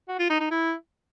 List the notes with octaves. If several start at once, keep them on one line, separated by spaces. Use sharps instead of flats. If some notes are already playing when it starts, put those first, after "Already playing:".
F#4
F4
D#4
D#4
E4